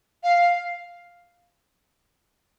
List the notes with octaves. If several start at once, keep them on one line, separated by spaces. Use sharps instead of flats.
F5